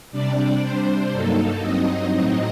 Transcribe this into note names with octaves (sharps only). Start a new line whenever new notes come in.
C3 G3 D4 D5
C3 G3 D4 C5
G2 F#3 A#3 D#4 A4
G2 F#3 C4 D#4 D#5
A2 F#3 C4 D#4